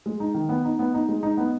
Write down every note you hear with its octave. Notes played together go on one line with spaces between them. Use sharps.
G#3
D#4
D#3
B3
D#4
B3
D#4
G#3
D#4
B3